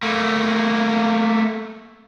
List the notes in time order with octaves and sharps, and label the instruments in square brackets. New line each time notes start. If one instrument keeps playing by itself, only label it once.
[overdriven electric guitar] A3 A#3